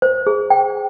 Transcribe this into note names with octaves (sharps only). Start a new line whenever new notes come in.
C5
G#4
G5